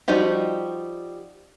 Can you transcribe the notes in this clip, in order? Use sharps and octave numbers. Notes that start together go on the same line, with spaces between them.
F3 G3 D#4 F#4 G4